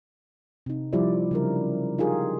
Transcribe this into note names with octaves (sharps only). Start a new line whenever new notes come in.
C3 D#4
F3 G3 E4 C5 D5
C#3 F#3 G3 D4 A#4
D#4 F4 G4 G#4 A#4